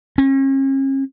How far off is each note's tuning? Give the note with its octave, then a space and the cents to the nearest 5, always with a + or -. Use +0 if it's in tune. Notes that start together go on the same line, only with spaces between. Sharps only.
C#4 -40